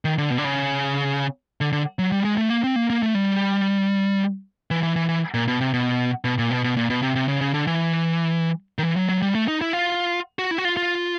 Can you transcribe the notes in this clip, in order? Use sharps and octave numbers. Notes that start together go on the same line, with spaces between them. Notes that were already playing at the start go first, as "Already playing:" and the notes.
D#3
D3
B2
D3
C#3
D3
D3
F#3
G3
G#3
A3
A#3
C4
A#3
A#3
A3
G3
E3
E3
E3
E3
A#2
B2
C3
B2
B2
A#2
B2
B2
A#2
B2
C3
C3
C#3
C#3
D3
E3
D#3
E3
F#3
F#3
G3
A3
D#4
E4
F4
F#4
E4
F#4
F4
F4